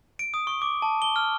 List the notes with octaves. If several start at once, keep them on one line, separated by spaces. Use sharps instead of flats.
D7
D#6
C#6
D6
A5
G7
F6